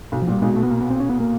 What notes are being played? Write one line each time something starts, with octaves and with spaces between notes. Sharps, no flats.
B1 B2
F3
A#2
G3
B1 B2 G#3
A3
B3
A#3
B3
C4
C#4
B3
A#3